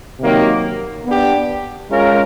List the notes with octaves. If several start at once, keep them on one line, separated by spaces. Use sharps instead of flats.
C3 D#3 F#3 A#3
B3 D4 G4
G#3 C#4 F4 A#4